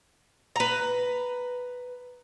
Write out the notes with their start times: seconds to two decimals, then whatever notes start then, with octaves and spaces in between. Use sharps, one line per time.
0.56 B4 A#5